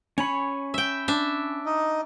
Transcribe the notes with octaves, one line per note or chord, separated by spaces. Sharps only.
C#4 C#5 G#5 B5
E5 G5
D4 E5
D#4 D#5